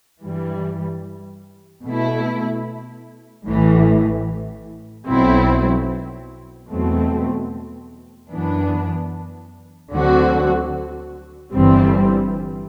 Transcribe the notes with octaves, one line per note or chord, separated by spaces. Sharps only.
G2 E3 G3
B2 A3 E4
A1 A2 E3
B1 B2 F#3 C4 E4
E2 B2 F#3 A3 C4
F#2 E3 B3 D4
D2 D3 F#3 C4 F#4
G1 G2 E3 G3 C4